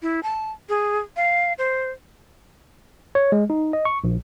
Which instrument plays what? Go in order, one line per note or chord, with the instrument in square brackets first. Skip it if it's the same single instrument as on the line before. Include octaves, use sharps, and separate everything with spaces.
[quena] E4
A5
G#4
F5
C5
[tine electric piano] C#5
G#3
D#4
D#5
C#6
A#1